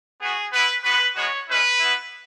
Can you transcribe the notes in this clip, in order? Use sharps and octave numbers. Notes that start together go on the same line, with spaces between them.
B3 F#4 G#4
B3 E4 B4
G#3 B3 F#4 B4
G#3 B3 F#4 C#5
G#3 C#4 E4 B4
B3 E4